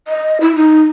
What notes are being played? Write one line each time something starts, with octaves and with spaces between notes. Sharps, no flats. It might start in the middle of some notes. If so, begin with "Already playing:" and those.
D#5
E4
D#4